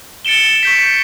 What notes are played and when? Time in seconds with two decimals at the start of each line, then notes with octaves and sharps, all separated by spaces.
0.25 A6 C#7 D7 E7 G7
0.63 C#6 G6 B6